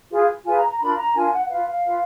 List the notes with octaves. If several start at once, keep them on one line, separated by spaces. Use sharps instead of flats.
F4 G#4 B4
F4 G#4 B4 G#5
A#5
A#5
D4 F4 A#4 B5
A#5
D4 F4 A#4 G#5
G#5
F#5
F#5
F4 B4 F5
F5
F4 B4